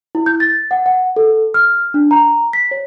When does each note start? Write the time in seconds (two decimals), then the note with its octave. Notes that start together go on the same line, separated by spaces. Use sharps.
0.15 E4
0.26 G6
0.40 A6
0.71 F#5
0.86 F#5
1.16 A4
1.54 F6
1.94 D4
2.11 A#5
2.53 B6
2.71 C#5